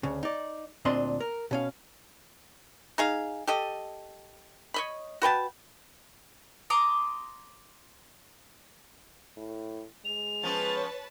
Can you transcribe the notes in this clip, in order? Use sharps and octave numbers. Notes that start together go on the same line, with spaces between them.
D2 C#3
D#4 D5
D2 A#2 C4 D4 D#5 C6
A#4
B2 C#4 F5
D#4 G#4 F5
G4 A4 D#5
C#5 D#5 B5
F#4 B4 G5 A5
A#5 C6 D6 D#6
A2
G#3 F7
F3 B3 C#4 B4 C#5 A5